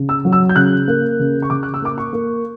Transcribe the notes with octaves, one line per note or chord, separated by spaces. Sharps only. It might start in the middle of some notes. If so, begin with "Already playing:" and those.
Already playing: C#3
E6
F#3
E6
G6
C#3 F#6
A#3
C#3
C#6
C#3 D6
F#6
E6
A#3 D6
C#6
A#3